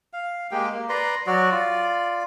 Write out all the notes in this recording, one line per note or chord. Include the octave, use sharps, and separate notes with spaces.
F5
G#3 A#3 G4 G5
A#3
B4 D5 A#5 C6
F#3 F#4 D5
F4 D5